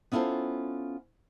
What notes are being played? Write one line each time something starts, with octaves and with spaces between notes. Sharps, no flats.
B3 C#4 E4 F4 A4 C5